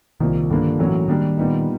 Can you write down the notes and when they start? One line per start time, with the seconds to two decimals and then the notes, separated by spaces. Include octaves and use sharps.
0.20 C2 A#2 D#3 F3 A#3
0.50 G2 D3 F3 A#3 D4
0.79 A2 E3 F#3 A#3 C#4 F#4
1.08 D#3 G3 A#3 D4
1.37 A#2 G3 B3 D#4